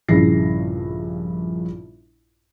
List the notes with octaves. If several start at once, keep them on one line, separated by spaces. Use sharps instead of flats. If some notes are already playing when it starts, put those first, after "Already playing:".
A#1 G2 C#3 E4 A#6 C7